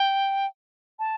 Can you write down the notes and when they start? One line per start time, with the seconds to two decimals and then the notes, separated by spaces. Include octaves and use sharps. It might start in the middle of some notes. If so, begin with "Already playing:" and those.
Already playing: G5
0.99 A5